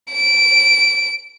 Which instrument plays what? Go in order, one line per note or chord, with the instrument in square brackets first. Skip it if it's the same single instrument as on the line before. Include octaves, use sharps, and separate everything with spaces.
[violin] D7